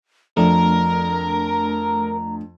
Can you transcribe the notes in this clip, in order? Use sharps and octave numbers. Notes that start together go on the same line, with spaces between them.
F2 A3 D4 A#4 A#5